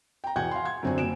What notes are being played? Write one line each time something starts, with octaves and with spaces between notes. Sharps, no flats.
G5 A#5
E2 B2 F#5 G#5 G6 G#6
F5 C6
G#6
F#2 D3 C4 F#4 C5 G#5
F#1 C5 D7 E7